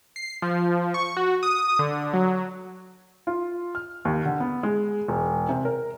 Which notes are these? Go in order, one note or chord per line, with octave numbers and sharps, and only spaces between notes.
C7
F3
C#6
F#4
D#6
D3
F#3
F4
F6
D#2
D3
B3
G#3
E1
C3
A#4